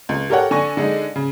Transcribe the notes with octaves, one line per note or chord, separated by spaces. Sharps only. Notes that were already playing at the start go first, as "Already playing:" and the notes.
C#2
G4 A4 A#4 C#5 F#5
D3 G#5 C#6 A#6
D3 G#3 D#4
C#3